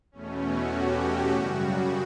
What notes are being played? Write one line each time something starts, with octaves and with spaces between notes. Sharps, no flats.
E2 B2 A3 C#4
F#4
G4
F#4
F#2 C#3 G3